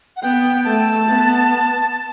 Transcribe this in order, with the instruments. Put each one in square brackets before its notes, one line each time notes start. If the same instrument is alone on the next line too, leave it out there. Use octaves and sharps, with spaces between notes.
[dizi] F#5
[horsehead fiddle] B3 [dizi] G5
[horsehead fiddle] A3 [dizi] A5
[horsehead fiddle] B3